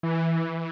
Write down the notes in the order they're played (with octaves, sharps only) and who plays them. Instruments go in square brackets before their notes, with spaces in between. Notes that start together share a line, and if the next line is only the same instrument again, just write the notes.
[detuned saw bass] E3